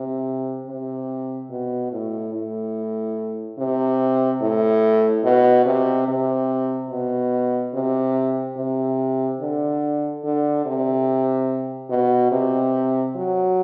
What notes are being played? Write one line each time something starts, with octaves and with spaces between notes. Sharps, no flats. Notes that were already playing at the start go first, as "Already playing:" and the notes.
Already playing: C3
C3
B2
A2
A2
C3
A2
B2
C3
C3
B2
C3
C3
D3
D3
C3
B2
C3
F#3